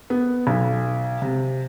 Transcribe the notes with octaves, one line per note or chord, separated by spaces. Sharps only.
B3
B1
C3